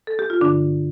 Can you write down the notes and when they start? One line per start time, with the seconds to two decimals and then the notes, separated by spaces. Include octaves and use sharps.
0.07 A4
0.19 G4
0.30 F4
0.40 G2 D3 F3 D4